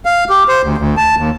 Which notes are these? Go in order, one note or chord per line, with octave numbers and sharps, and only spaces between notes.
F5
G4
C5
D2
D2
A5
D#2